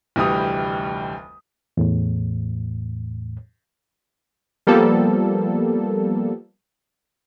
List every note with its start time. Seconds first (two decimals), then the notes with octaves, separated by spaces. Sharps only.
0.16 F1 D2 E3 G3 G4 D#6
1.77 E2 A2
4.67 F3 G3 A#3 B3 A4